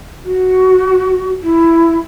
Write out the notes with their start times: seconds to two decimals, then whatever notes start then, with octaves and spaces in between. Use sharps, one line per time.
0.25 F#4
1.42 E4